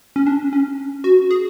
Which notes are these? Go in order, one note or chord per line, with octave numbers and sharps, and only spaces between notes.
C#4
D4
C#4
F#4
G#4